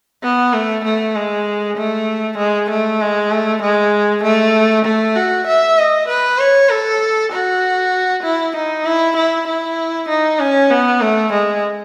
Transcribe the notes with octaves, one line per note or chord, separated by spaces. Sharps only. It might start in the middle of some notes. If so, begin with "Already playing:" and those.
B3
A3
A3
G#3
A3
G#3
A3
G#3
A3
G#3
A3
A3
F#4
E5
D#5
B4
C#5
A4
F#4
E4
D#4
E4
E4
E4
D#4
C#4
B3
A3
G#3